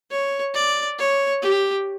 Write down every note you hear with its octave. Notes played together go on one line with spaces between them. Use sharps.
C#5
D5
C#5
G4